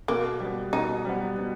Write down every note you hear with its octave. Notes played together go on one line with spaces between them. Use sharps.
B2 A#3
G3
B3
B2 D#4
G3 B3
B2